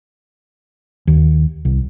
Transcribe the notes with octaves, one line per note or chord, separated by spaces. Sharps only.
D#2
C2